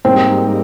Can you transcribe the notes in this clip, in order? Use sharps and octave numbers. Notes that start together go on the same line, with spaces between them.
G#2 G3 A#3 C4 D#4